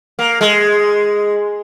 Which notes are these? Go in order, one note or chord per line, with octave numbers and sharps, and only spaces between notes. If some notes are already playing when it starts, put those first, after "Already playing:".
A#3
G#3